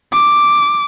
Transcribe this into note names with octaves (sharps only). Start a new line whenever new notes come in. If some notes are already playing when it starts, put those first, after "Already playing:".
D6